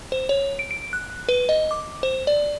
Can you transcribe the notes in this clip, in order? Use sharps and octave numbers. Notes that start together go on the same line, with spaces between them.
C5
C#5
D7
D7
F#6
B4
D#5
D6
C5
D5